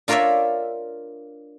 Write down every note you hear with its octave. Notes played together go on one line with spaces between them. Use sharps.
D4 F4 A#4 C#5 D5 E5